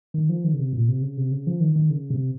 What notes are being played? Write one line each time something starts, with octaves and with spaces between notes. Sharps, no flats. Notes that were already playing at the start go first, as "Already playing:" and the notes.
D#3
F3
D#3
C#3
C3
A#2
C3
C#3
C3
C#3
F3
D#3
D#3
C#3
C3